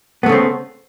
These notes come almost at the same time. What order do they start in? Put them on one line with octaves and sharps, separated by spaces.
B3 A3 C#3 C4